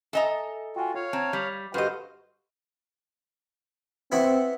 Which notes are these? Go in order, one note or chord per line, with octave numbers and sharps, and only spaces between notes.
A4 D#5 E5 G#5 A#5 D#6
F4 F#4 G5 G#5
F4 C#5 F5
C4 A5 A#5 G#6
G3 G6 B6 F7
G2 F#4 G4 A4 B4 C5 D#5 F5
B3 C4 E4 F#4